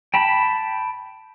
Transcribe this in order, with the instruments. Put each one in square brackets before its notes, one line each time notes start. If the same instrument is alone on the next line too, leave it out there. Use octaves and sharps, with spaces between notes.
[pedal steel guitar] G5 A5 B5